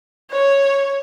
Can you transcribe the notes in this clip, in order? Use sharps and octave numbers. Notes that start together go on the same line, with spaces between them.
C#5